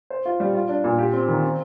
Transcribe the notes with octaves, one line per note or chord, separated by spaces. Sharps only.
C5
F4
G3
F4
D4
A#2
G4
C4
D#3
C4